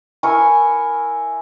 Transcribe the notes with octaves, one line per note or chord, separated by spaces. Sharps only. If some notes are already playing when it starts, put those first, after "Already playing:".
E4 A#4 G#5 C#6